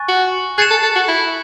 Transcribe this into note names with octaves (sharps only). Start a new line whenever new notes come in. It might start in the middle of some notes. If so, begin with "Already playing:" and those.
Already playing: G#5 C#6 F#6 A6
F#4
G#4 F#6 A6 C#7 E7
A4
A4
F#4
E4